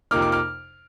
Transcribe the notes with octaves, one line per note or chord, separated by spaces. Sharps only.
F2 C3 F3 A#3 D#4 D6 F6
D6 F6
D6 F6